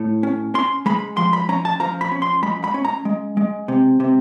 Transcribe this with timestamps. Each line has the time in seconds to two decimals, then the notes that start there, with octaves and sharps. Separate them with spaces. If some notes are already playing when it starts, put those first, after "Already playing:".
Already playing: A2
0.23 C#4
0.54 C#4 C6
0.86 G#3 B5
1.17 F3 C6
1.33 B5
1.49 C#4 A#5
1.65 A5
1.80 F3 A#5
2.01 B5
2.12 C#4
2.22 C6
2.43 G#3 B5
2.64 B5
2.74 C#4
2.85 A#5
3.05 G#3
3.37 G#3
3.68 C3
4.00 C3